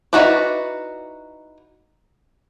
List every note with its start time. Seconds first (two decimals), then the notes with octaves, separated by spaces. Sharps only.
0.13 D#4 E4 F#4 B4 D5